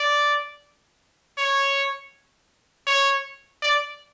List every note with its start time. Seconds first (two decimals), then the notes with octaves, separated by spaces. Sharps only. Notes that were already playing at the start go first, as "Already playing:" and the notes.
Already playing: D5
1.38 C#5
2.87 C#5
3.62 D5